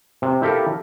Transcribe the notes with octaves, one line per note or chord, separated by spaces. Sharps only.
C3
E4 G4 A4 A#4 F5